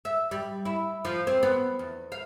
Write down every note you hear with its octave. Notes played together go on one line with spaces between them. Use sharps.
E5
G3
E4
F3
C4
B3
E2
F5